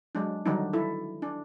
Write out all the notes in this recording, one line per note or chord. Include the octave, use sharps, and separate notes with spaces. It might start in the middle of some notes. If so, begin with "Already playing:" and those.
F#3 G#3 D4
D3 D#3 F#3 G3 D4 D#4
E4 A4
D4